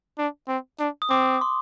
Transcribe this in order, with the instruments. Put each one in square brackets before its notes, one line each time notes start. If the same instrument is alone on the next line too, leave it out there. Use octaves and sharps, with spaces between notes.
[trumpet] D4
C4
D4
[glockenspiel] D#6
[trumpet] C4 [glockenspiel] D6
[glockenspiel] C6